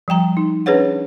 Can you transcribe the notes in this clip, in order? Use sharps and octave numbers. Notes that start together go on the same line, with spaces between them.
F3 G3 G5 A#5
D#4
C#4 D4 G#4 B4 C#5 F#5